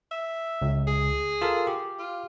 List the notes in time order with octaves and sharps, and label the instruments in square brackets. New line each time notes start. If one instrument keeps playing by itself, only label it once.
[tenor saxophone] E5
[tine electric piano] C#2
[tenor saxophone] G#4
[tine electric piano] F4 A4 A#4
G4
[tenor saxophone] F4